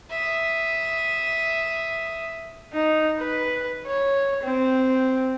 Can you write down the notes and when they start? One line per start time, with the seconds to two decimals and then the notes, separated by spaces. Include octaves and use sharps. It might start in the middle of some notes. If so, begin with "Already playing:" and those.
0.10 E5 D#6
2.73 D#4
3.19 B4
3.87 C#5
4.43 C4